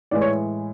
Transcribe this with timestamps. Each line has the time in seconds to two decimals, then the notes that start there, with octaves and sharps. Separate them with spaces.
0.11 A2 E3 G#3 D5
0.21 C#5